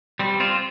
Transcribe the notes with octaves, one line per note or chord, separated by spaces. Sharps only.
G3 C4
C4 F4